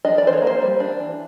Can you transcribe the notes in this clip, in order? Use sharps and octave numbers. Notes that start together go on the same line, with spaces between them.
D4 D#5
D5
E3 C5
C#5
A#3 C5
G3
D4
E3